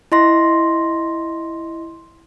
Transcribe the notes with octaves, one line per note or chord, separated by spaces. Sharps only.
E4 D#5 C6 A#6